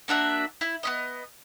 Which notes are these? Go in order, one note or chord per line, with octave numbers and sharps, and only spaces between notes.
A#3 D4 F#4 E5
E4
B3 C#4 D#5